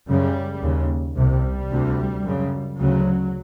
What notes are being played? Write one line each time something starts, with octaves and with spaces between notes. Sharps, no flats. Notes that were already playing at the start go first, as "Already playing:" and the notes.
F#2 C#3 G3
D#2 C#3
C2 C3 G3
D2 C3
F#2 C#3
D2 C#3 F#3